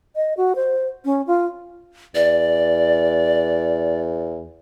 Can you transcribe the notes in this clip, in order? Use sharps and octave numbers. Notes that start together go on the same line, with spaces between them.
D#5
F#4
C5
C#4
F4
E2 D5